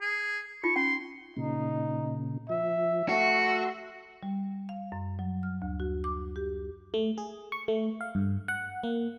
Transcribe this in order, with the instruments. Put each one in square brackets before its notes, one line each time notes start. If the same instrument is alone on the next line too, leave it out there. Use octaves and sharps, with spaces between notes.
[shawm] G#4
[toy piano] D#4 F4 [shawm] C#6
[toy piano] C#4 G5 [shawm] C6
[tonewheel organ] A#2 C#3 [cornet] D#4
[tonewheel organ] F3 [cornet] E5
[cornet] A3 [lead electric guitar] F#4 [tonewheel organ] E5 C6
[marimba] G3
F5
F#2
F#3
F6
D2
F#4
D6
G4
[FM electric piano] A3
G#4
C#6
A3
F5
G2
F#5
A#3